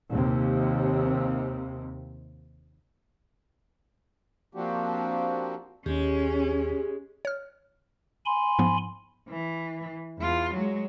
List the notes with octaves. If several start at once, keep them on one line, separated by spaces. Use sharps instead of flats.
D#2 C3
F3 A#3 C4 D4 F#4 G4
D#2 G#3 C#4 G4
C#5 F6
G#5 B5 C6
G#2 F3 B3
E3
E2 F4
F#3 G#3